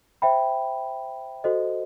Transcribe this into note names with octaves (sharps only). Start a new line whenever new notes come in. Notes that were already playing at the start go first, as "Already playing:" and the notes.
C5 E5 G5 B5
F#4 A4 C5 D#5